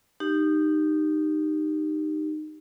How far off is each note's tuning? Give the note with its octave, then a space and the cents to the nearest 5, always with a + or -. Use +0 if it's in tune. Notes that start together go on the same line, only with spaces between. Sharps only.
D#4 -20 G4 +0